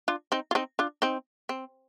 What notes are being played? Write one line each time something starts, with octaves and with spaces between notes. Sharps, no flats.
D4 F4
C4 D#4
F4
C4 D#4
D4 F4
C4 D#4
C4